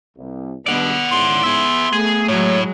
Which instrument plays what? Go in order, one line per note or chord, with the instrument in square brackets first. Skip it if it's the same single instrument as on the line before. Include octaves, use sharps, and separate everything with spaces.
[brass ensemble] C2
[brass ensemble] G2 B2 G#3 [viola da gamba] B3 [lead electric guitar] D5 F#5
[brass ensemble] G#2 C#3 E4 [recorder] C6
[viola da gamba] B3 [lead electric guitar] G#4 E5
[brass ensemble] A3 [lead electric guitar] G#4
[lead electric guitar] A2 [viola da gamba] F#3 G#3 [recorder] C#5